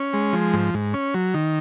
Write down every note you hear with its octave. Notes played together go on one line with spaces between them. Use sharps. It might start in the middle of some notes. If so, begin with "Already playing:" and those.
Already playing: C#4
G#3
F3
G#2
G#2
C#4
F#3
D#3